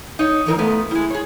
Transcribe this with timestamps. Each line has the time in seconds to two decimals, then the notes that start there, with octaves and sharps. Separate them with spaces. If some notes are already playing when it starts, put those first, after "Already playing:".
0.19 D#4 C#5
0.46 D#3 E3 A#4 C#5
0.59 A#2 A3 B3
0.91 G3 G#3 E4
1.10 G#4 C#5